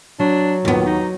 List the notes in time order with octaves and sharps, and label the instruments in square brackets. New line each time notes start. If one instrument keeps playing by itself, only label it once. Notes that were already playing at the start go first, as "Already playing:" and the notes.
[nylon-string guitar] F#3 [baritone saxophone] D4
[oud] D#2 B3 [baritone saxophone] A#2
[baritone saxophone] D#4